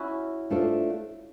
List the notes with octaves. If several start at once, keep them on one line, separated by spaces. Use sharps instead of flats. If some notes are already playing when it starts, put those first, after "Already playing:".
Already playing: C#4 E4 F#4
A3 D4 F4 A4 C5